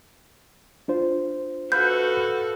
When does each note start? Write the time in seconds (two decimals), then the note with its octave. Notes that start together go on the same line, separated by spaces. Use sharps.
0.88 D4 F4 C5
1.72 F#4 A4 B4 E5 F5 G6